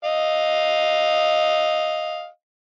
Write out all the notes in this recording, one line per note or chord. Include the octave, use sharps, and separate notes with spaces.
D#5 F5